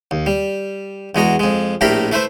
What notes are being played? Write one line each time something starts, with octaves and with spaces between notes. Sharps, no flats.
D#2
G3
E2 G#3 F#4 A#5
F2 G#3
A#1 A2 A3 G4 A#4 B5
A3 E4 B4 C5 E5